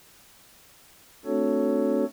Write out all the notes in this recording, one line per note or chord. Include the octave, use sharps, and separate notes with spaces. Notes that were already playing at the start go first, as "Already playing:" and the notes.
A3 C4 D4 F#4 A4 C#5